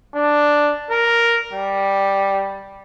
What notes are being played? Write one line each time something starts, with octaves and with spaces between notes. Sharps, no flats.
D4
A#4
G3